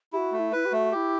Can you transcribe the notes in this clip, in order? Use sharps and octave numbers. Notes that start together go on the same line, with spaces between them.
E4 F#4 G4
A3
E4
E4 B4
G4
A3 F#4
E4 F#4 G4